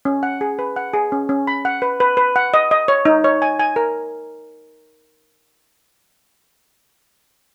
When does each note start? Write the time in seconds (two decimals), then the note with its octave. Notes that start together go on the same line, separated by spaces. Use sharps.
0.05 C#4
0.23 F#5
0.41 G#4
0.59 B4
0.76 F#5
0.93 G#4
1.12 C#4
1.29 C#4
1.47 B5
1.65 F#5
1.82 B4
2.00 B4
2.17 B4
2.36 F#5
2.54 D#5
2.71 D#5
2.88 C#5
3.05 D#4
3.24 C#5
3.42 G#5
3.60 G#5
3.76 A#4